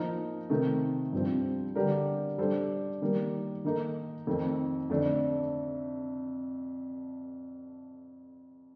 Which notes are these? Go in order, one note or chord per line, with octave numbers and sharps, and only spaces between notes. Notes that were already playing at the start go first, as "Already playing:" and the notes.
Already playing: F3 A#3 D#4 A#4
C3 D#3 A3
G2 F3 C4
D3 G3 D4 G4 A#4
G3 D4 A4 C5
D#3 G3 A#3
D#3 A#3 D#4 A4
F2 D#3 A3
F2 D3 A3 D4 A4